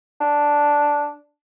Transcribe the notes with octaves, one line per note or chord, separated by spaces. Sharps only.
D4